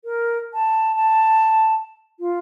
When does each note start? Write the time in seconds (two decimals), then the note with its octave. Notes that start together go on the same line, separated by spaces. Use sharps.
0.05 A#4
0.54 A5
0.96 A5
2.20 F4